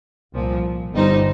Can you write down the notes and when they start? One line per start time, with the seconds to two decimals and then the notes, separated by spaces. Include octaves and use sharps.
0.33 C2 A#2 F3
0.93 G1 G2 G3 D#4 C5